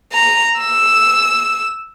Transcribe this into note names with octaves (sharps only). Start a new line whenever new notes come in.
A#5
E6